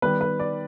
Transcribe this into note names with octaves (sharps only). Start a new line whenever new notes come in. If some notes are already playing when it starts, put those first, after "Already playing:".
D#3 G3 B3 B4
B4
D5